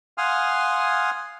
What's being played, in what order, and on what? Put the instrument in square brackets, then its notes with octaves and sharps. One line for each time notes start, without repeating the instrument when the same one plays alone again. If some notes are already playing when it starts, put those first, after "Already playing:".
[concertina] F5 F#5 G#5 C6 D#6 F6